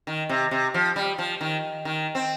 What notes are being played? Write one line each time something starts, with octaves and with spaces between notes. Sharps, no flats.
D#3
C3
C3
F3
G3
F3
D#3
D#3
C4